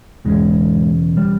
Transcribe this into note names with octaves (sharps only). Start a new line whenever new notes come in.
E1 E2 G#2 C#3 G#3
G3